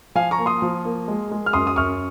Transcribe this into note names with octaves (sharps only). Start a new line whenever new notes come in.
F3 F5 G#5
A#5 C#6
A#3
C6 D#6
F3
A#3
G#3
G#3
F6
F#2 C6 D#6
D#6
F#2 C#6 F6